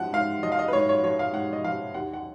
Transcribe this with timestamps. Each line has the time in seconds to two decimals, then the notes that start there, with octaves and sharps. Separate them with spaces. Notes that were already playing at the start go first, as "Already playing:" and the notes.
Already playing: G#2 F3 F#5
0.13 G#2 F5
0.43 F3 D#5
0.52 F5
0.59 D#5
0.68 B4
0.73 G#2 C#5
0.89 C#5
1.04 F3 C#5
1.19 F5
1.33 G#2 F#5
1.53 D#5
1.64 F3 F5
1.94 D#2 F#5
2.13 F#5